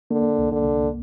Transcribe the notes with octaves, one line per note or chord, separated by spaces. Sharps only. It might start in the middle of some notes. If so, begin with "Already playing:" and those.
D3 A#3
C2
D3
C2